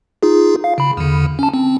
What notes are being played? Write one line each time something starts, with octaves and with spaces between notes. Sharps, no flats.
D#4 F4 G#4
F5
C#3 B5
E2 D3
C#4 A5
C4